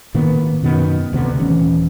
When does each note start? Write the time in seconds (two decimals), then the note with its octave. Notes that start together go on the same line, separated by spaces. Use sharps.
0.14 A2 D#3 A#3 B3
0.63 F#2 B2 D#3 B3
1.12 D#1 D2 C3 B3
1.39 D#1 E3 C#4